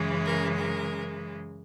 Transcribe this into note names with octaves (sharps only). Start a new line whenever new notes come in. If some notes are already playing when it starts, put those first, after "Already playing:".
Already playing: F#2 C#3 E3 G#3
A#4
A#4